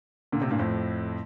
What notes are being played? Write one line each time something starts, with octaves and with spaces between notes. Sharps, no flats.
A#2 D3
A2 C3
G2 A#2
F2 A2